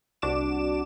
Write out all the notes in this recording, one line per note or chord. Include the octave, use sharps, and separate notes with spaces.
C2 D4 F#4 D6 E7